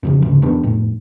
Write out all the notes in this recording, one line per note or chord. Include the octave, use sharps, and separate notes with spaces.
F2 C#3 F3
D2 G#2 C#3
E2 B3 D4
F2 A2